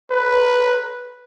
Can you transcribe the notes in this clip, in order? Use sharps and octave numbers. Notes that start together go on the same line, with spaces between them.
B4